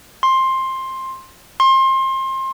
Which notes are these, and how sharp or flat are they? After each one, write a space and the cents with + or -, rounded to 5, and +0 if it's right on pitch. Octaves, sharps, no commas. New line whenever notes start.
C6 +15
C6 +30